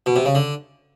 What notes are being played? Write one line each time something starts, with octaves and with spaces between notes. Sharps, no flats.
B2
C3
C#3
D3